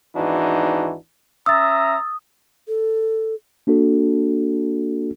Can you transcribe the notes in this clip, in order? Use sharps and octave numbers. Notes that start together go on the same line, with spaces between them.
G#1 E2 E3 D4 D#4 F#4
C#4 E5 A#5 D#6 E6 A6
A4
A#3 D4 F#4 A4